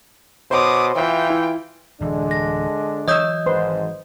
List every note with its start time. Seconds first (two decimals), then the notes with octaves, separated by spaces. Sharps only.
0.51 B2 C5 C#5 C6 D6 D#6
0.96 E3 F4 G5
1.30 E4
2.01 D1 D3 E3 G#3 D4
2.31 A#6
3.08 E3 F#3 C#5 D#5 D#6 E6 G6
3.46 G#1 G#2 B4 C5 C6